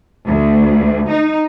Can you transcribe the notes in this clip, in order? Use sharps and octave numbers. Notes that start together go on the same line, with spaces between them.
D2
D#4